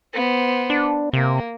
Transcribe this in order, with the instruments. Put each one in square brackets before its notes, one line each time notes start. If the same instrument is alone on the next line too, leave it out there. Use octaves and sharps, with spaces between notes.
[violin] B3 C5
[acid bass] D4
[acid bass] C3 [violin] A#3